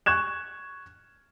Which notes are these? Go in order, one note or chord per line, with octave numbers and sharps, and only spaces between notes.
C#6 F#6 G#6 E7